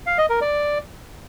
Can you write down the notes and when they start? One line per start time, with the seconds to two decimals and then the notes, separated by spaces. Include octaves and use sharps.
0.06 F5
0.18 D#5
0.30 A#4
0.41 D5